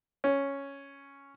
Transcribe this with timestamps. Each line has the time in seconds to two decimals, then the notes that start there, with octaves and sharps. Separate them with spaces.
0.24 C#4